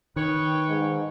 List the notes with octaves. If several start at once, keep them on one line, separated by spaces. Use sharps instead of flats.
D#3 B4 C#5 G5
G#2